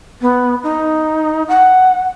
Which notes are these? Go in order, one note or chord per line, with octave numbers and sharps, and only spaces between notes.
B3
D#4
F#5